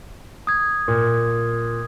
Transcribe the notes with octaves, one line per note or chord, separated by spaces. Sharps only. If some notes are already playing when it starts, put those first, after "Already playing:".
D#6 G#6
A#2